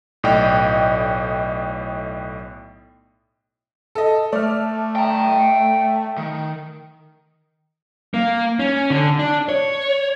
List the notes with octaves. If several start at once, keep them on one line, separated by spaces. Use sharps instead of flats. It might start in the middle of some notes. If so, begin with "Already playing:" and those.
B1 A2 D5 D#5 G5
A4 D#5
A3 D5 F6
G5 A#5
D#3
A#3
C#4
D3
D4
C#5